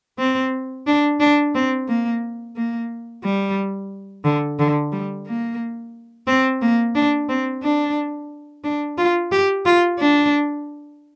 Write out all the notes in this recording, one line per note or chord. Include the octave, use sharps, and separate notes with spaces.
C4
D4
D4
C4
A#3
A#3
G3
D3
D3
G3
A#3
C4
A#3
D4
C4
D4
D4
F4
G4
F4
D4